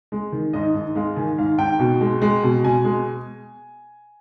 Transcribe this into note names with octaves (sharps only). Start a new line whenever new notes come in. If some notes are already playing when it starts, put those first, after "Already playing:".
G#3
D#3
G#2 D#5
G#2
G#3 F5
D#3 G#5
G#2 F5
G#2 G5
B2
G#3
G#3
B2
B2 G#5
G#3